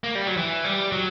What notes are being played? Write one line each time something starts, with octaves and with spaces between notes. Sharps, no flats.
A#3
G3
F#3
E3
G3
F#3